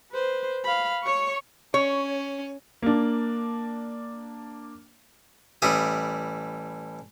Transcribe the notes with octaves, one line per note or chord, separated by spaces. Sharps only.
B4 C5
F5 B5
C#5 C#6
C#4 C#5
A#3 D4
A1 G3 E4 D#6